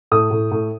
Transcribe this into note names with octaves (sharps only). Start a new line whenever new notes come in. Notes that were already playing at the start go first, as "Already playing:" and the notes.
A2 D#6
A2
A2